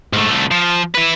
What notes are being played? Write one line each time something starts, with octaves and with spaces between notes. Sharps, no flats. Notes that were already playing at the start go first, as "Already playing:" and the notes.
G#2 A3
C2 A3
F3
E4 B4